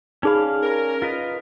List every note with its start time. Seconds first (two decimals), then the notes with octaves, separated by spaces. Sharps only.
0.23 C#4 D#4 G#4 D5 F5 B5
0.62 A#4
1.02 F4 B4 D#5